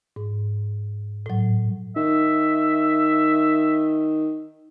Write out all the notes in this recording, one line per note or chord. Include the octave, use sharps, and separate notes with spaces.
G#2
A2 F#3
D#3 E5